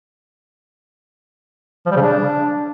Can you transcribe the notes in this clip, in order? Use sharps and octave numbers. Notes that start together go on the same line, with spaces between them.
F3
G3
C#3
D4